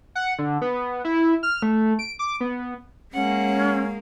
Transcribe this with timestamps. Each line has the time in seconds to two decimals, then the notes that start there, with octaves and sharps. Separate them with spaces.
0.15 F#5
0.39 D3
0.62 B3
1.05 E4
1.43 F6
1.62 A3
1.99 D7
2.19 D6
2.40 B3
3.13 G#3 A#3 C#4 F#5